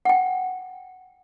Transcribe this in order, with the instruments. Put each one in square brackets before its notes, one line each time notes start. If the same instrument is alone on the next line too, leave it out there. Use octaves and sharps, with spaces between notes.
[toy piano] F#5 G5